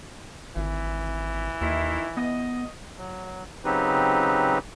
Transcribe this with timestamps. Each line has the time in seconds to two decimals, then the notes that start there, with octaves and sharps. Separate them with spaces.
0.56 G#1 E3
1.61 D#2 D#3 E4
2.17 B3 D#5
2.98 F#3
3.65 C#3 F#3 C4 D#4 G4 B4